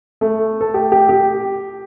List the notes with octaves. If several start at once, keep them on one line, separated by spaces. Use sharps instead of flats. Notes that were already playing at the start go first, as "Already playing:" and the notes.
A3
A4
G4
G4
G4